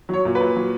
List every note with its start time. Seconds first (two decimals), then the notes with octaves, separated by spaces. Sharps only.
0.09 F#3 C#5
0.25 A#2
0.35 B4
0.40 A#2
0.56 F#3